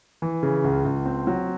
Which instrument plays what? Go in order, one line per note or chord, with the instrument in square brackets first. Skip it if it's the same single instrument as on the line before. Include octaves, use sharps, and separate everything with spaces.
[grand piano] E3
C#3
C#2
C#2
C4
F#3